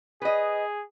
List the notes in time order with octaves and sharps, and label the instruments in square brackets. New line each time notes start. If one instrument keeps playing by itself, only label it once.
[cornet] G#4 [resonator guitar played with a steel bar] B4 D#5